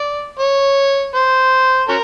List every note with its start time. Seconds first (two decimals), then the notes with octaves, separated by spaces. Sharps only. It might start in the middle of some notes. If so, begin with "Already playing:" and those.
Already playing: D5
0.39 C#5
1.15 C5
1.89 C#4 F#4 A#4